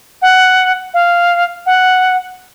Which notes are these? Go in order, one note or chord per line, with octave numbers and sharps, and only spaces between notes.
F#5
F5
F#5